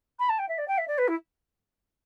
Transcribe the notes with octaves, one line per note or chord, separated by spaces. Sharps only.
B5
A5
G5
E5
D5
G5
E5
D5
B4
E4